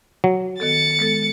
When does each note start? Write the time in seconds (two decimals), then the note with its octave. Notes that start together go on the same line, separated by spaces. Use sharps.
0.24 F#3
0.60 D#3 B3 A4 A6 C#7
0.99 G#3 B3 A4